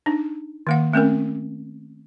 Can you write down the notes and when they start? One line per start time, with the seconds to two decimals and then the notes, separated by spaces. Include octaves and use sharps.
0.06 D4 D#4
0.67 D#3 A#3 F#5
0.93 A3 C4 C#4 A#4